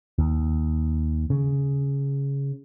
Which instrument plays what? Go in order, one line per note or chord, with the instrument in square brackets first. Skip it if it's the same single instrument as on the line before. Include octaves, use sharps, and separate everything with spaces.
[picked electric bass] D#2
C#3